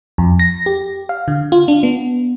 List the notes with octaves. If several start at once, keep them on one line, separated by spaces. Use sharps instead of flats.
F2
A#6
G4
F5
D3
F4
D4
B3